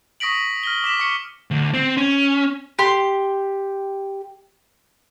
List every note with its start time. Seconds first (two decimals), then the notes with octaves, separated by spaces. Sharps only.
0.20 C#6 D#6 A#6 B6 D7 F#7
0.63 F6 A#6 G7
0.84 D6 B6 E7 F#7
1.00 C#6 C#7 E7 G7
1.51 D2
1.74 C4
1.97 C#4
2.79 G4 C6